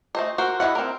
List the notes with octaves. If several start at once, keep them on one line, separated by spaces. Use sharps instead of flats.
A3 C5 D#5
F#4 A#4 C5
G3 E4 D#5 F#5
C4 A#4